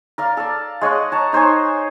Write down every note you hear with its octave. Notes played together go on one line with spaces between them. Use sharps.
A#4 D5 F5
A4 D5
G#3 C#5 D#5 F#5
C#5 A5 A#5
D#4 C5 C#5 G#5